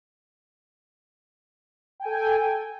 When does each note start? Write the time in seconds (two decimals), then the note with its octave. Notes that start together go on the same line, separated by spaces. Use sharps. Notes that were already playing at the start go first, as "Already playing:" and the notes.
2.00 G5
2.02 G#5
2.05 A4